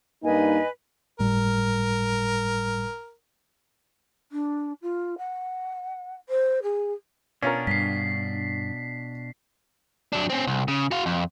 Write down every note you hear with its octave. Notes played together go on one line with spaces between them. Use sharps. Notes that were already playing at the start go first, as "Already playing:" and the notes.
G2 A#3 D#4 B4 D#5 G#5
G1 A2 G3 A#4
D4
F4
F#5
C5
G#4
B2 C#4 D4 F4 A#4
G2 B6 C7
F#3 D4
C4 C#4
C2
C#3
F#4 F5
F2